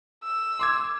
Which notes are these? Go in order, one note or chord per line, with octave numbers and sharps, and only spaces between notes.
E6
C6 D6 G#6